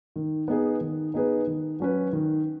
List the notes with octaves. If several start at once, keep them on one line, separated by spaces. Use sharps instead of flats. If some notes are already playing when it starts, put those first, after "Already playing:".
D#3
B3 D#4 G#4 B4
D#3
B3 D#4 G#4 B4
D#3
F#3 C#4 F#4 B4
D#3